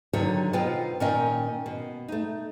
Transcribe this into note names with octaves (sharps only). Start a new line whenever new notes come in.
D3 D#3 F#3 G3 G4 C#5
B2 B3 D#4 F4 C5 G5
A#2 D#3 C#4 A#4 D#5 G5
B2
A3 D#4